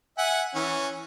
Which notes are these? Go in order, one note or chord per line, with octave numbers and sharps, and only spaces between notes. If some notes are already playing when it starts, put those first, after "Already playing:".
E5 F#5 G#5
E3 C#4